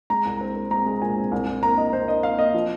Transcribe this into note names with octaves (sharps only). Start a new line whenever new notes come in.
G#3 A#5
C2
C4
C4
G#3 A#5
G#3
A#2 G#5
C4
C2
C2
A#3 A#5
C2 D#5
C2 C5
A#3 D#5
A#3 F5
A#3 D#5
F3